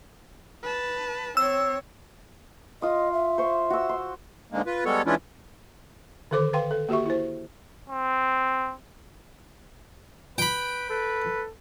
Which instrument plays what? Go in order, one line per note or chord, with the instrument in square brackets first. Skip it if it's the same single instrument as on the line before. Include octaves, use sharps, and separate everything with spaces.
[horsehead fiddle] B4 A5
[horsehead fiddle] C4 C#5 [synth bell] E6
[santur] F4 D#6 [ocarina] D#5
[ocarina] E5
[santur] C5 C#6
F#4 E6
C6
[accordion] G#2 D3 G#3 A#3
F4 B4
G3 G#3 B3 A4 C#5
E3 G#3 C#4 D4 E4 F4
[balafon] D3 D#3 A4 C5 D6
B4 F5 G5 C6
A4
A#3 F#4 G4 E5 C#6
E4 C5
[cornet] C4
[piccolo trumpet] B4 [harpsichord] G5 B5
[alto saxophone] A4 [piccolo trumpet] B4